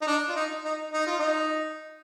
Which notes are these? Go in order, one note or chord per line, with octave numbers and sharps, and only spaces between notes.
D#4
D4
F4
D#4
D#4
D#4
F4
D#4